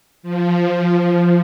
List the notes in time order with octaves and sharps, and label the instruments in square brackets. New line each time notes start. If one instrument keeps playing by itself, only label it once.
[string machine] F3